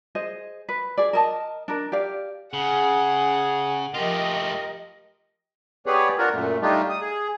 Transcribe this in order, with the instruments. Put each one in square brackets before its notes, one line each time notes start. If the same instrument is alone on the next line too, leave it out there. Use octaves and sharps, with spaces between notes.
[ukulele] G#4 C5 D#5
B4
G#4 D5
A#4 D#5 A5
D4 A#4
G4 D5 F5
[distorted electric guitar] C#3 [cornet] G#4 [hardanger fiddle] F#5
[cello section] F3 A#4 D#5 [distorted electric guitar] A3 F4 [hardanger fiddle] G4
[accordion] B3 G4 G#4 B4 C#5 D5
D4 F4 F#4 A#4
F#2 A#2 A3
G3 A3 D4 D#4 F4 G4
D#6
G#4